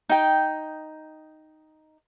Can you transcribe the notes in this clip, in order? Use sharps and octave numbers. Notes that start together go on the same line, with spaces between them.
D#4 G5